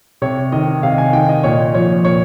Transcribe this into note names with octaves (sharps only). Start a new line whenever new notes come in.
C3 C#5
D#3 D#5
C3 F5
G#5
D#3 G5
D#5
A#2 C#5
F3 C#5
A#2 C#5